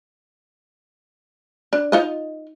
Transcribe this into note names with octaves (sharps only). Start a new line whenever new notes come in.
D4
D#4 F4 D#5